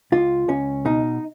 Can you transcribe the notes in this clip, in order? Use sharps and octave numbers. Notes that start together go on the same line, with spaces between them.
C#2 F4
C#2 C#4
B2 D#4